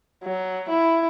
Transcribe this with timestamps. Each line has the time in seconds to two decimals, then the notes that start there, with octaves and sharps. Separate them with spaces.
0.24 F#3
0.69 E4